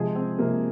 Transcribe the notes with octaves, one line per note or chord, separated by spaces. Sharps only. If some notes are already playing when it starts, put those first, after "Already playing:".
Already playing: C3 F3 G#3 F4 G#4
C4
C3 F3 G#3 A#3